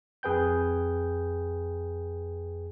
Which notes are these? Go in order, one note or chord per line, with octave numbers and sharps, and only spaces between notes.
F2 G#4 B4 G5 G6